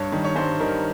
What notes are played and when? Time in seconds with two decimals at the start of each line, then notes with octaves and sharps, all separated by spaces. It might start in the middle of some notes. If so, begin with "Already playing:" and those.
Already playing: G2 C#5
0.12 D#3 G3
0.25 C#5
0.35 G2 C5
0.60 D#3 G3 A#4